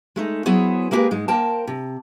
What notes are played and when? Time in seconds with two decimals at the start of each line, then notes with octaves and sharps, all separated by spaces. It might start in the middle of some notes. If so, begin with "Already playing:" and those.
0.16 G#3 A3 D#4
0.46 F#3 B3 E4 G#4 C5 C#5
0.91 G#3 A#3 E4 G4 G#4 B4
1.11 G#2 G#3
1.28 A#3 A#4 C5 G5 A5
1.67 C3